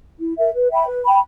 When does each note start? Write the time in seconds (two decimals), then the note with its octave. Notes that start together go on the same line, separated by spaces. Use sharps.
0.20 E4
0.37 A#4 E5
0.54 B4
0.71 E5 G5 B5
0.87 B4
1.04 G5 B5